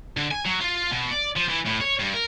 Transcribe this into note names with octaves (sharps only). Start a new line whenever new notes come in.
D3
G#5
F#3
F4
B2
D5
F3
E3
A2
C#5
G2
A#4